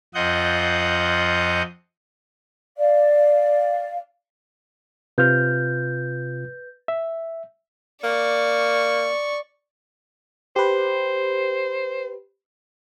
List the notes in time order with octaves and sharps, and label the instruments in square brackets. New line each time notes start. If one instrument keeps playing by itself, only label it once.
[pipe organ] F2 F4 D#5 F#5 G6
[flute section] D5 F5
[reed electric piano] C3 F4 F6 [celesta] B4 G6
[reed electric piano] E5
[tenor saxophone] A#3 [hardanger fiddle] D5 C#6
[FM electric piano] G4 B4 [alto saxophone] C5